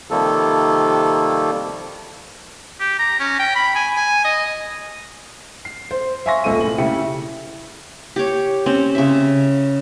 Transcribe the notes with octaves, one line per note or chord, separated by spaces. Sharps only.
C3 D#3 F3 G3 A#3 A4
G4
A#5
C#4
G5
B5
G#5
G#5
D#5
C7
C5
E5 F5 G#5 C6 C#6 A#6
D#1 C#2 A4 D#7
A2 F#7
C#3 E4 G4 E5 C#7
G4 C#5
C4 C#4
C#3 E5